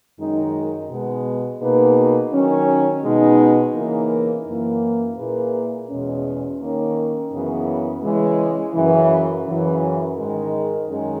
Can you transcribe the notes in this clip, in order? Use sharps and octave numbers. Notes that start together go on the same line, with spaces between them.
F#2 D#3 G#3 D#4
B2 G#3 B3
B2 A#3 D#4 G#4 B4
D#3 F#3 C#4
B2 G#3 B3 D#4
C#3 E3 A#3 D#4 A#4
F#2 E3 A#3
A#2 A#3 E4 G#4 B4
E2 B2 G#3 C#4
D#3 A#3 C#4
F#2 C#3 E3 B3
C#3 E3 G#3
F#2 C#3 E3
F#2 C#3 E3
G#2 D#3 G#3 D#4 A#4
F#2 D#3 G#3 C#4 G#4